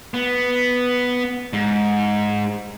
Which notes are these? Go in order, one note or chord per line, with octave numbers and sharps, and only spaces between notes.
B3
G#2